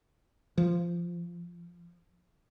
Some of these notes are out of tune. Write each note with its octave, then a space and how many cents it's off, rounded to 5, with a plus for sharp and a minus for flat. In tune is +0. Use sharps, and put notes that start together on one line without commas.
F3 -15